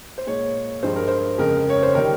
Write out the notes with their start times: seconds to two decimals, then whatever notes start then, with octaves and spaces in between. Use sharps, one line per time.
0.18 C5
0.27 A#2 G#3 C#5
0.83 G2 F3 G#3 C5
0.96 A#4
1.08 C5
1.38 F2 C#3 F3 G#3 A#4
1.70 C#5
1.83 C5
1.95 D#3 G3 A#4